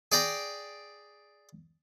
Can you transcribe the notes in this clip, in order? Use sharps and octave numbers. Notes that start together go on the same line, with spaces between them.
G#4 D5 G5 A#5